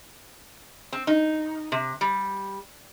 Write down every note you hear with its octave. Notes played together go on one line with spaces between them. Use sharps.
C4
D#4
C3
G3